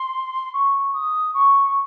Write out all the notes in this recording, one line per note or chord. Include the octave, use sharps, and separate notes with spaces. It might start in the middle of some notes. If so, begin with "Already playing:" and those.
Already playing: C6
C#6
D#6
C#6